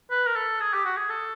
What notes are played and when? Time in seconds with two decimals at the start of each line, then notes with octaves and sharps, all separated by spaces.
0.11 B4
0.27 A#4
0.36 A4
0.60 G#4
0.73 G4
0.85 F#4
0.97 G#4
1.09 A4